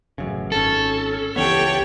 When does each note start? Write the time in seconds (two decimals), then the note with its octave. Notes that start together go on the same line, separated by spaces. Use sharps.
0.18 A1 F#2 C#3
0.52 G#1 C#4 A4
1.36 C#2 E3 B3 G4 C#5 G5 A5